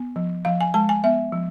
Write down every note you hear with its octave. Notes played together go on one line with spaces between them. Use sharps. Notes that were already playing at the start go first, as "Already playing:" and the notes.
Already playing: B3
F3
F3 F5
G#5
G#3 A5
G#5
B3 E5
F3